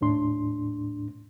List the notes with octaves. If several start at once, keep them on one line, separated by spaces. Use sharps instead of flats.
D#2 A2 D4 C6